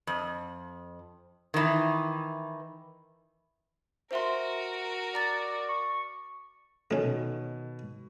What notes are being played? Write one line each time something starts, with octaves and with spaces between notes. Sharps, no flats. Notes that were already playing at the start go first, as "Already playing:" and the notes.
F2
D#3 E3
F#4 A#4 C5 E5 C6
D5 A#5 A6
C#6
B2 D#3 A3 C#4